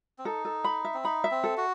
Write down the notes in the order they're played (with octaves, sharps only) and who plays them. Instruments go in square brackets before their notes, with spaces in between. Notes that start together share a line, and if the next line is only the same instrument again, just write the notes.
[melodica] C4
[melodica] D#4 [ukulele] A4
[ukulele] A4
B5
E5
[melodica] C4
[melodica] D#4 [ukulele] B5
[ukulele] E5
[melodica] C4
[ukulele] A4
[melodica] F#4